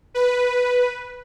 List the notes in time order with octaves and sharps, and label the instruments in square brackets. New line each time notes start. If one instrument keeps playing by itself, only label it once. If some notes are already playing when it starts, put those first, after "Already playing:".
[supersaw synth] B4